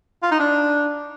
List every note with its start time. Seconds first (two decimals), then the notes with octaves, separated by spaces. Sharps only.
0.23 F4
0.31 D#4
0.40 D4